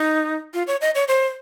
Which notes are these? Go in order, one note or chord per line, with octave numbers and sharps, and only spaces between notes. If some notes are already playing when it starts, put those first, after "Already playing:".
Already playing: D#4
F4
C#5
D#5
C#5
C5